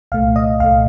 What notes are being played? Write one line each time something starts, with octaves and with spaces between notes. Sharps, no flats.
C2 A#2 A3 F5
D#5
C2 A#2 A3 F5